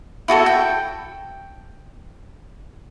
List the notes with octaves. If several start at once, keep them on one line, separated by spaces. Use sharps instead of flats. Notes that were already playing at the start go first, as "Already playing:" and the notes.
E4 F#4 G#4 A4
G5